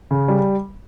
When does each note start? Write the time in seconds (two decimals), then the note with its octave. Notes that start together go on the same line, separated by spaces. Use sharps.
0.11 C#3
0.28 G3